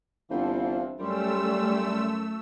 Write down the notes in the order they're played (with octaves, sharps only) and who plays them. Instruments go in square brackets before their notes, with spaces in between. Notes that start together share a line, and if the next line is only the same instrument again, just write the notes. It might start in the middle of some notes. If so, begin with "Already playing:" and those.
[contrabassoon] G1 [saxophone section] E3 C4 [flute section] F5 F#5 A5
[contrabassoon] F#2 [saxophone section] G3 [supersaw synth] A3 E6 [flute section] C#4 C6